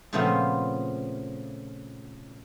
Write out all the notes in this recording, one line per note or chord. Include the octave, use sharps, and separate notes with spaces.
A#2 C#3 F3 A3 B3 C4